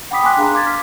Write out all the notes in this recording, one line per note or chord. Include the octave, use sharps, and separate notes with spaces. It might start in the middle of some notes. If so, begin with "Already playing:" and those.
F#5 G5 B5 D6 D#6 B6
G5 G#5 C6 D6 F#6 B6
D4 G#4 F5 A#5 C6
C6 D6 G#6 A6
D6 F6 B6